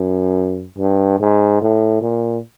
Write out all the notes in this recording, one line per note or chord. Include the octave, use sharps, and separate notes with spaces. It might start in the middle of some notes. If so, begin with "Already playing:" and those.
Already playing: F#2
G2
G#2
A2
A#2